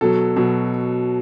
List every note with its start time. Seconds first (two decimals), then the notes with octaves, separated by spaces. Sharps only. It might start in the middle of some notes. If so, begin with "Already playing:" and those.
0.01 B2 F#3 A4
0.36 B2 F#3